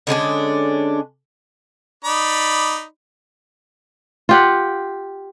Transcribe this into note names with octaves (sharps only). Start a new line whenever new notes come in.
D3 G#3 C#4 D4
D#4 D5 B5
F4 G4 F#5